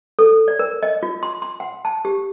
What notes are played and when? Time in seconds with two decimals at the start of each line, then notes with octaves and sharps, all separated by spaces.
0.19 A4
0.48 D5
0.59 A#4
0.83 D#5
1.03 F4
1.23 C6
1.42 C6
1.60 F#5
1.85 A5
2.05 G4